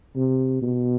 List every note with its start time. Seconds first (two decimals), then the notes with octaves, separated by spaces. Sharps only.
0.16 C3
0.62 B2